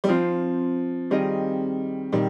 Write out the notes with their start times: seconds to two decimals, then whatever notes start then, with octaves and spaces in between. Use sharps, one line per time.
0.04 G3
0.09 F3 C4 F4 C5
1.10 D#3 G3 C4 F4 G#4 D#5
2.12 A#2 D#3 G3